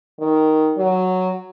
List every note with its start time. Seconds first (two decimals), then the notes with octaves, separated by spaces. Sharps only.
0.20 D#3
0.77 F#3